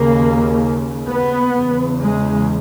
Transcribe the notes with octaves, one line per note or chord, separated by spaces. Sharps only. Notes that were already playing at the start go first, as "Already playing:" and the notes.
Already playing: D#2 C#3 A#3
B3
E2 C#3
G#3